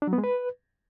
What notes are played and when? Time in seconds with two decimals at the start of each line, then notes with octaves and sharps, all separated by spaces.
0.02 D4
0.07 F#3
0.13 B3
0.18 G#3
0.24 B4